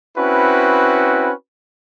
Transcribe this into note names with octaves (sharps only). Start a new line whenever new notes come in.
C4 C#4 E4 F#4 B4